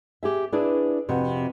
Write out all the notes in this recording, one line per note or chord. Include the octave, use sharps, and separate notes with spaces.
G4 G#4 E5
D4 E4 G#4 B4 D5
F2 C3 F#4 B4